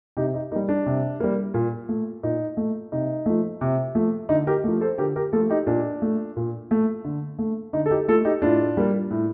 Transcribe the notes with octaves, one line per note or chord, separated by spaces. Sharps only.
C3 D#4 G4
D#4
G3 A#3 D#4
D4
C3
G3 A#3
A#2
A3
A#2 D#4
A3
C3 D#4
F3 A3
C3
F3 A3
D3 D#4
G4 A#4
F3 A3
A4 C5
D3 G4 A#4
G4 A#4
F3 A3 F4 A4
D#4 G4
A#2 D4
A3
A#2
A3
D3
A3
D3 D#4
A4
D#4 G4
A3 F4 A4
D#4 G4
A2 D4 F4
G3 A#3
A2